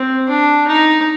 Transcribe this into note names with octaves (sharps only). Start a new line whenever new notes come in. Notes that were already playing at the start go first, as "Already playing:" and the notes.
Already playing: C4
D4
D#4